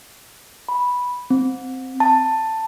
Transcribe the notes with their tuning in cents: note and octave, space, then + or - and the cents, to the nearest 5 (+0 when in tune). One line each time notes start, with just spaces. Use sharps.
B5 -5
C4 -5
A5 +10